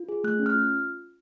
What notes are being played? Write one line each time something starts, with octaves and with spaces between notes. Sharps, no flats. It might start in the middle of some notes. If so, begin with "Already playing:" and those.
Already playing: F4
G#4
A3 F#6
C#4
F6
F4